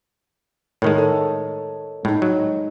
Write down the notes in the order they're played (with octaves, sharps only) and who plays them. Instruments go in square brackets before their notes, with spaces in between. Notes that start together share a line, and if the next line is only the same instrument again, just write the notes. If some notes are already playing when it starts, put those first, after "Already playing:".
[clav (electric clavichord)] A2 D#3 G#3 [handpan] A#4 C#5
[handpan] A4 D#5
[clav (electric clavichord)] A2 [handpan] G#3 D#4
[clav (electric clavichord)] F#3